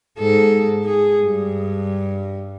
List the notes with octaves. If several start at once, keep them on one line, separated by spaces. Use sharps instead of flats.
G#2 A4
G#4
G2